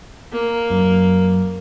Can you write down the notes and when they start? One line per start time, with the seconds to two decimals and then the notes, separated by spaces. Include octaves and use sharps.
0.32 A#3
0.70 F#2